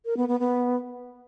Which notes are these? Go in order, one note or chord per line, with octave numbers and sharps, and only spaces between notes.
A#4
B3
B3
B3